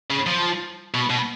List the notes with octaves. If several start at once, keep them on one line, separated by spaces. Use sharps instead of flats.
C#3
F3
B2
B2